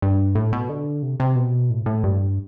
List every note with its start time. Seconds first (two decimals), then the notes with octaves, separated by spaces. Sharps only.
0.02 G2
0.35 A2
0.53 B2
0.69 D3
1.03 C3
1.20 C3
1.36 B2
1.70 A2
1.86 A2
2.04 G2